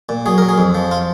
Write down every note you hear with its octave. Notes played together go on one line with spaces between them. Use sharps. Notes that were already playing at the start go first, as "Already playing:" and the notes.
A#2
F#3 G#4
F#3 A#4
G#4
F2
F3
F4